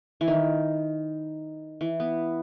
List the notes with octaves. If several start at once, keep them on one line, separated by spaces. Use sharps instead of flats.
E3
D#3
E3
B3